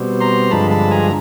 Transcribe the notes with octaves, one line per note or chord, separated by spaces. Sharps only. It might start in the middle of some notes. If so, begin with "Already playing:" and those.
Already playing: B2 G3 C4
A#5 C6
G2 D3 F3 G#3 A5 B5
A5 B5
G#5 A#5